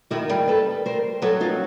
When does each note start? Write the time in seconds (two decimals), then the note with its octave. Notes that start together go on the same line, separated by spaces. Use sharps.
0.10 D#3 E4 F#4
0.29 G3 G#4 A#4
0.48 A4 B4
0.86 A#4 C5
1.22 F#3 A4 B4
1.40 D#4 F4